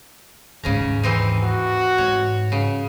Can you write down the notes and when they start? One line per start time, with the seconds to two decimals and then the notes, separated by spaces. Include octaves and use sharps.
0.64 D#2 G#2 C#3 C#4 A#5
1.03 E3 C4 D#4
1.44 F#4
1.98 G#2 C#5
2.52 C#3